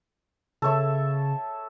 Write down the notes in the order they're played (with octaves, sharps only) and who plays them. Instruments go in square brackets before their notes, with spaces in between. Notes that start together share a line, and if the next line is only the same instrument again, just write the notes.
[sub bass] C#3 [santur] A4 C#5 E5